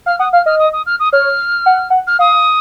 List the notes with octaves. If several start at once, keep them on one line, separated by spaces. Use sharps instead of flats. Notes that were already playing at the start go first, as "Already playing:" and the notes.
F5 F6
F#5 D#6
F5 F6
D#5 F6
D#6
D#6
F6
D#6
C#5 F6
F#5
F#5
F6
F5 D#6